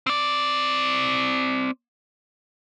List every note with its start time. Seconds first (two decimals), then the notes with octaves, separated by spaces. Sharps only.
0.07 C4 D5